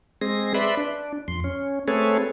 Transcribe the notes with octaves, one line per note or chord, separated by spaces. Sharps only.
G#3 C4 G#4 A#6
B4 D5 E5 B5 C6
D4
F2 C6
C#4
A3 C4 G#4 A4 B4 C#5